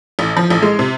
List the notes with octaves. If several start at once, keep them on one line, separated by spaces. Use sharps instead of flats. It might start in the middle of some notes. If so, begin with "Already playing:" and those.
A1
F3
A1
G#3
C3